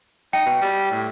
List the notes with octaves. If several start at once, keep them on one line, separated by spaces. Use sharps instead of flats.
D#4 G5
B2
G3
A2